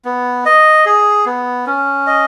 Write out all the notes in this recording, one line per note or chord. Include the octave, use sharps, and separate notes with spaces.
B3
D#5
G#4
B3
C#4
D#5